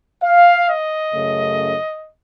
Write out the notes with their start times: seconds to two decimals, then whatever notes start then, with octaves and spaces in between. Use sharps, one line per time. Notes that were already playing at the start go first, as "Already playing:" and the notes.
0.23 F5
0.68 D#5
1.13 F#2 C#3 A3